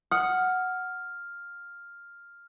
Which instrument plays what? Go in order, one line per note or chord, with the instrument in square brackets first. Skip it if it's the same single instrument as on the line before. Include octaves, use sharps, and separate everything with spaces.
[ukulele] F#5 [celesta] D#6 [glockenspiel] F6